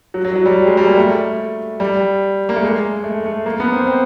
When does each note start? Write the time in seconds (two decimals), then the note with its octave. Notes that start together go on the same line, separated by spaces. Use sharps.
0.14 F#3
0.24 F#3
0.36 F#3
0.46 G3
0.67 G#3
0.77 G3
0.87 A#3
0.98 A3
1.80 G3
2.49 A#3
2.56 A3
2.63 G#3
3.04 A3
3.26 A3
3.46 A#3
3.60 B3
3.73 C4
3.87 C4